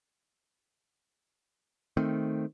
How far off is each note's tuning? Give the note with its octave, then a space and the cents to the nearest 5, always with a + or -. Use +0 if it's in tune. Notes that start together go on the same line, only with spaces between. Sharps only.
D#3 +0 A3 +0 C4 +0